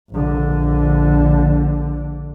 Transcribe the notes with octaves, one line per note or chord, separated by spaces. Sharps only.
A#1 D3